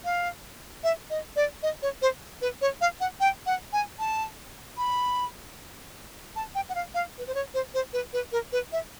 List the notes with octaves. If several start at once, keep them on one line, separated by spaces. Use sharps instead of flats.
F5
E5
D#5
D5
D#5
C#5
C5
B4
C#5
F5
F#5
G5
F#5
G#5
A5
B5
A5
G5
F#5
F5
F5
B4
C5
C#5
C5
C5
B4
B4
A#4
B4
E5